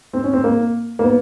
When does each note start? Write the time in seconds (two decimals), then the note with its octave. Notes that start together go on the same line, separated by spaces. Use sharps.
0.13 C4
0.24 C#4
0.33 C4
0.44 A#3
0.99 A#3
1.04 B3